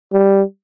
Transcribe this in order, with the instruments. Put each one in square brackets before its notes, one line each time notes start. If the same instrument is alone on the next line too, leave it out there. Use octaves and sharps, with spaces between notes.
[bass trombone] G3